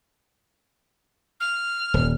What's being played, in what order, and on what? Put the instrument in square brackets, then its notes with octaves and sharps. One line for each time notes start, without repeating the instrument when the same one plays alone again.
[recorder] F6
[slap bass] D#1